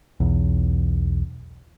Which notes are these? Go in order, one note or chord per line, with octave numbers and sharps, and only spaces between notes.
B1 E2